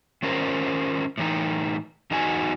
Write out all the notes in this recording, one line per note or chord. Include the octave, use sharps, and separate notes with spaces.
D#3 C#4 F4 A#4 C5
A2 E3 D#4
E2 D#4 F#4 G#5